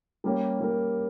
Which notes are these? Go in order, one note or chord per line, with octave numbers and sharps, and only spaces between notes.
G3 A#3 C#4 G4 A#4
G3 A#3 C#4 G4 A#4